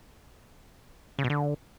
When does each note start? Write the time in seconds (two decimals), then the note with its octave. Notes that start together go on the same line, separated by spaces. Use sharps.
1.19 C#3
1.24 B2
1.30 D3